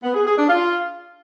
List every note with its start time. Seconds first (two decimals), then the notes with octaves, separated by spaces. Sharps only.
0.03 B3
0.15 G#4
0.26 G#4
0.37 D4
0.48 F4